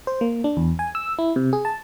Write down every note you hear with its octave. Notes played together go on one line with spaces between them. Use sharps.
C5
A#3
D4
E2
G#5
E6
E4
C3
G#4
A5